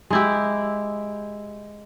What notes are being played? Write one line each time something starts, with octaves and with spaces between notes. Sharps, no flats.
G#3 E4 G4